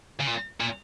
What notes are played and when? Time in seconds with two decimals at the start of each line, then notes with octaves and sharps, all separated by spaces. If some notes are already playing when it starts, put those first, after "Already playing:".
0.20 C#3
0.27 A#2
0.60 A#2